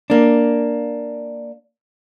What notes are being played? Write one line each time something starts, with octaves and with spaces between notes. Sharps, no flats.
A#3 D4